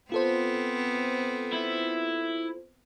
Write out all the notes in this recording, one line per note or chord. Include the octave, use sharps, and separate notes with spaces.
B3 C4 F4 A4 C5
E4